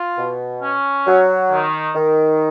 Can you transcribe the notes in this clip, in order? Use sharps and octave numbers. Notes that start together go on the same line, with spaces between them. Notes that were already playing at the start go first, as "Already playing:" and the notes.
Already playing: F4
B2
C#4
F#3
D#3
D#3